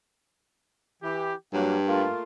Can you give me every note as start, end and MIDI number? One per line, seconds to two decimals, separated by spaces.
1.02 1.33 52
1.02 1.33 67
1.53 2.07 43
1.53 1.77 54
1.53 1.77 58
1.87 2.23 57
1.87 2.23 58
1.87 2.23 65